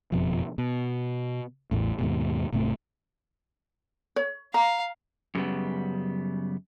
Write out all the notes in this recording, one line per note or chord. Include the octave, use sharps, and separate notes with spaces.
F#1 F2 B2 F3
B2
A1 E2 A2
D#2 G#2 B2
D#1 G#2 C3 A3
C#5
F5 A#5
F#2 C#3 G3 B3